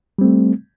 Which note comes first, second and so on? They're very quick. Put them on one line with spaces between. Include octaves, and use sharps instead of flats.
G3 C4 A3